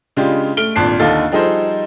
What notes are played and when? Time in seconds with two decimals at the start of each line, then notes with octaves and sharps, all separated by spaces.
0.17 C#3 G#3 D4 F4 G4
0.57 A3 F6 D7 G7
0.76 G#1 A#2 D4 A5 F#6 C7
0.99 D#2 D3 D#4 A4 F5 A6
1.32 F3 G3 D#4 G#4 A4 C5